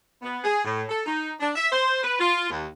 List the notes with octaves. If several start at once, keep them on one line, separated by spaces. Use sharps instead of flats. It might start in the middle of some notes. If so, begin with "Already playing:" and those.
B3
G#4
A2
A4
D#4
D4
E5
C5
B4
F4
D#2